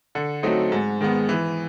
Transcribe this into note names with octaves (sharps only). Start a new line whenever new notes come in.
D3
F#3 A3 C4 D#4
G#2
D#3 G#3 B3
E3